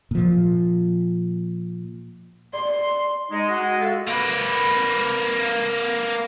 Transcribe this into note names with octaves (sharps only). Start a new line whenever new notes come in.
A#2 F3
D5 C6
G#3 D#4
F#4
F4 A4 E5
A#3 B4